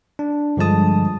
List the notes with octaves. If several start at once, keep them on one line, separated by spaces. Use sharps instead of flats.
D4
G2 D3 F3 G#3 A5 D#6